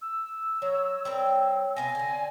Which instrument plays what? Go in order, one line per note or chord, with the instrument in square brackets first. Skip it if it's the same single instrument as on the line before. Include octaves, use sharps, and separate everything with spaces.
[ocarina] E6
[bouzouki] F#3 [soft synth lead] C#5
[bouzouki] G3 C4 A#4
[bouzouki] C3 B3 F5 [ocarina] G#5 [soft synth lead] A#6
[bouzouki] D3 C4